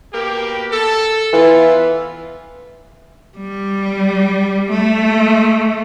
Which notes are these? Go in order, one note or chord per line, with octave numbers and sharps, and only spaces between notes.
B2 A#3 G4
A4
E3 B3 E4 F4
G3
A3